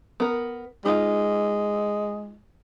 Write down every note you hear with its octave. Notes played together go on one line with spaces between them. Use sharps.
B3 A#4
G#3 D#4 F4